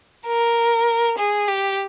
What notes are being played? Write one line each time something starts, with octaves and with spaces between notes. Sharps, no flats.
A#4
G#4
G4